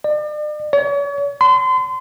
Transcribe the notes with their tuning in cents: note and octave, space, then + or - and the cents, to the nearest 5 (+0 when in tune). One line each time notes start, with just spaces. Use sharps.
D5 +40
C#5 +40
C6 -35